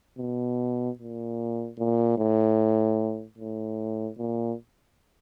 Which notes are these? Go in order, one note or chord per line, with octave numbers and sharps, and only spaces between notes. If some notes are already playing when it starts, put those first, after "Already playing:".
B2
A#2
A#2
A2
A2
A#2